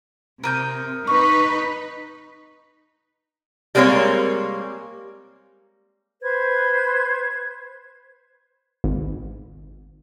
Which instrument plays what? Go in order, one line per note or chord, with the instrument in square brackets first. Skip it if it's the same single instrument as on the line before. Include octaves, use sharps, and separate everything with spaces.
[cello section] C3 [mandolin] A#4 D#6 G6
[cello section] D#4 B4 [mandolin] C#6
[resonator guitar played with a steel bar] G3 G#3 A#3 C4 A#4 C#5
[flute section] B4 C5 G#6
[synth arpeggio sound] G#1